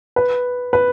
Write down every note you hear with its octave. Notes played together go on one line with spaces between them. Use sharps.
B4
B4